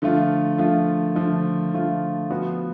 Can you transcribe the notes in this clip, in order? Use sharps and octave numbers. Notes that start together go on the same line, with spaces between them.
D3 F3 A3 F4
D3 F3 A3 F4
D3 F3 A3 F4
D3 F3 A3 F4
F3 B3 F#4